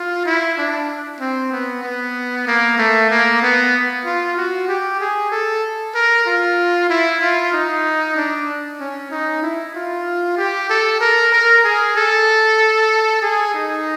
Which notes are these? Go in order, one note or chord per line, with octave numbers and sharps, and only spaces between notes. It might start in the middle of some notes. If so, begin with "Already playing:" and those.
Already playing: F4
E4
D4
C4
B3
B3
A#3
A3
A#3
B3
F4
F#4
G4
G#4
A4
A#4
F4
E4
F4
D#4
D4
C#4
D#4
E4
F4
G4
A4
A#4
A#4
G#4
A4
G#4
D#4